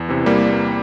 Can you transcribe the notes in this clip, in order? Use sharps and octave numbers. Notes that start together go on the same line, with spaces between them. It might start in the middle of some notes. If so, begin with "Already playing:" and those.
Already playing: E2
C3 E3
G3 A#3